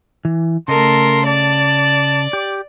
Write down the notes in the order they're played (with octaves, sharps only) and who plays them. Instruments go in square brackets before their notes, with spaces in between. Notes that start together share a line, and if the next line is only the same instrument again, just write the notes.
[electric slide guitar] E3
[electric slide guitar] C#3 D#5 [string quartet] A3 A4 A#4 [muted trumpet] C6
[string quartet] D5 [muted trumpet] A5
[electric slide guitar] G4